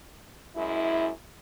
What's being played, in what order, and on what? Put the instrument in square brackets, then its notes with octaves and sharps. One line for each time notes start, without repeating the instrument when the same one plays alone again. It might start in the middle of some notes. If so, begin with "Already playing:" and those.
[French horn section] F#2 G#3 E4